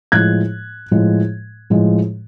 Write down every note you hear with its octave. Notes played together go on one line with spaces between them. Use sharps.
A2 F3 G#3 F#6 G#6
A2 F3 G#3
A2 F3 G#3